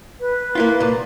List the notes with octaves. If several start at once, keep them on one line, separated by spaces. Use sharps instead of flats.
B4
A#3 E4 F4
C2 A#2